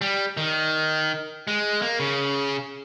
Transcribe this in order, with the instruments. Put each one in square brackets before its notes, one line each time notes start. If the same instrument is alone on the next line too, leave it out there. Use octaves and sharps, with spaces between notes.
[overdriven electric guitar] G3
D#3
G#3
A#3
C#3